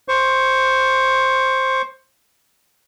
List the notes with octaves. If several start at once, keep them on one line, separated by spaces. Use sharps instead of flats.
C5 C#6